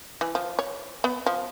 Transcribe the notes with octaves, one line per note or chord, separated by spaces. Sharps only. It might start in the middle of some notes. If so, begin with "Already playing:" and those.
E3
F3
C#5
B3
F3